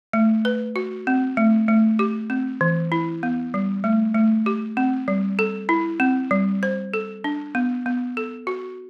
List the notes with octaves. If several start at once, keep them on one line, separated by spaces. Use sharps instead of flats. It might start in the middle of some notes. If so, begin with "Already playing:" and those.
A3
B4
F#4
C4
A3
A3
G4
C4
E3
E4
B3
G3
A3
A3
G4
C4
G3
A4
E4
C4
G3
C5
A4
D4
B3
B3
A4
F#4